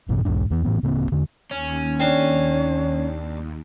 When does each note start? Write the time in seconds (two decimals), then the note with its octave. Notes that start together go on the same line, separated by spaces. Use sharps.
0.09 A1 F#2 B2 E3
0.25 B1 E2 G#2 D4
0.50 E2 E3 B3
0.64 A2 E3 B3
0.83 D1 C#3 A#3 C4
1.12 E2 D3
1.51 D#2 C#4
2.00 C4 D4 C#5